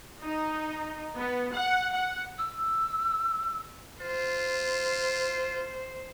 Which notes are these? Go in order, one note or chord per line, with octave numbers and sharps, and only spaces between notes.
D#4
B3
F#5
F#5
E6
F4 C5